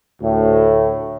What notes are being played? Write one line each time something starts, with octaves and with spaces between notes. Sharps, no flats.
D2 A2